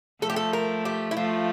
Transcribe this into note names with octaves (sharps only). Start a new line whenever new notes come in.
F3 A3 A4
G4
A4
A#4
G4
E4
F3 A3 F4